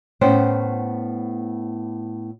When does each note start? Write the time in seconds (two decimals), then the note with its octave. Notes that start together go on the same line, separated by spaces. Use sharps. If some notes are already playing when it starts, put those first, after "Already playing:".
0.21 A2 B3 C#4 C5 F#5 G5